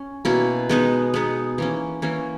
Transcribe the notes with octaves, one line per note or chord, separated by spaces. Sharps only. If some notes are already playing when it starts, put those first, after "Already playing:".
Already playing: C#4
B2 A#3 C#4 E4
G#3 B3 D#4
G#3 B3 D#4
E3 A#3 C#4
E3 A#3 C#4